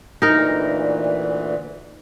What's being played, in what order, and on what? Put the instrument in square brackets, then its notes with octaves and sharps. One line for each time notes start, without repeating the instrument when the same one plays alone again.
[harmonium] D2 A#2 E3 [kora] D#4 A#4